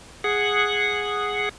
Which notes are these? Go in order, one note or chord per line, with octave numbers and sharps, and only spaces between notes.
G#4 F#5